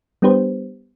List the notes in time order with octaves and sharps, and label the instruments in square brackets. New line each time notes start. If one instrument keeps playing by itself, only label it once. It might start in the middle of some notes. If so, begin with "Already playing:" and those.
[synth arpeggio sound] G3 B3 D4 G4 B4 C5